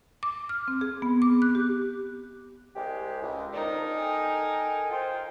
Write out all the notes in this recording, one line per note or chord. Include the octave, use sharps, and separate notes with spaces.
D6
F6
C4
G#4
B3
D6
F#6
G4
C2 G#3 G4
C#2
D#3 C4 D4 D#4 A#4
A4 G5 G#5
F4 C5 G5